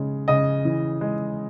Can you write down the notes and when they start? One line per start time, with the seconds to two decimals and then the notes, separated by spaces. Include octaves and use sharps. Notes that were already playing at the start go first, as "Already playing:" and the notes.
Already playing: C#3 G#3
0.28 C#3 D#5
0.65 E3
1.01 G#3